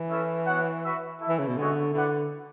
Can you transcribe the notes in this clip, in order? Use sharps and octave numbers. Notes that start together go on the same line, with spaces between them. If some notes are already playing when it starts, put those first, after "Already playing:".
Already playing: E3
C#4 E4 A4 E5
B3 F#4 C#5 F#5
F#4 B4 E5
E4 A4 E5
E3
C#3
B2
D3 G#3 B3 F#4 C#5 E5
D3 E4 B4 D5 F#5